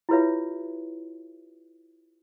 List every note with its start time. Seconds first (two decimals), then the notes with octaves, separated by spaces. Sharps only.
0.09 E4 F4 G4 B4 C#5 E5